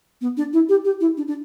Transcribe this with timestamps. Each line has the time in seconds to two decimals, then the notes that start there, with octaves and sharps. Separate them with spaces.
0.21 B3
0.37 D4
0.53 E4
0.69 G4
0.85 G4
1.00 E4
1.17 D4
1.27 D4